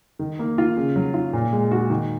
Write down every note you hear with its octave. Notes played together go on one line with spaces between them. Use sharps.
D#3
A#3
F4
C#3
F#3
F4
A#2
G#3
F#4
D#3